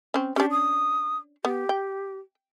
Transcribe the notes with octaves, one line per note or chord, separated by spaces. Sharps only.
C4 C#4
C#4 D4 G4
D#6
B3 G4
G5